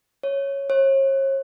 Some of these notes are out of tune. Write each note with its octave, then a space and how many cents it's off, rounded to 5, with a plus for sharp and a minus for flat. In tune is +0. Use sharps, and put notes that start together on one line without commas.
C#5 -5
C#5 -40